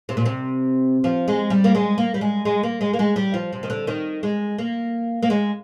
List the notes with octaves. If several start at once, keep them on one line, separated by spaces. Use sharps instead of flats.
C3
A#2
C3
F3
G#3
G3
A#3
G#3
A#3
G3
G#3
G#3
A#3
G#3
A#3
G#3
G3
F3
C3
D#3
D3
D#3
G#3
A#3
A#3
G#3